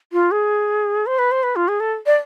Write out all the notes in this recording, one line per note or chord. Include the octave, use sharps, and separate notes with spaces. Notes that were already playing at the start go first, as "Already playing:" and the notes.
F4
G#4
C5
B4
C5
B4
F4
G#4
A4
D5